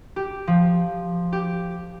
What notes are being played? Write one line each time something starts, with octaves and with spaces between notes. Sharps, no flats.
G4
F3
G4